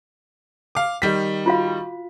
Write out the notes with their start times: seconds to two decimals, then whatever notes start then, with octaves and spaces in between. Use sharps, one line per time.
0.75 F5 D6
1.02 D#3 G3 B6
1.46 F4 F#4 F5